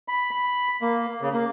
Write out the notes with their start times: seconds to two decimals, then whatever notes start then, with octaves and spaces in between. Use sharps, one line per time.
0.08 B5
0.31 B5
0.82 A#3
1.21 C#3
1.33 A#3